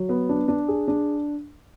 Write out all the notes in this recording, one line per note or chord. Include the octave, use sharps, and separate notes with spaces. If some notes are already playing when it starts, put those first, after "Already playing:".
Already playing: F#3
B3
D4
D4
G#4
D4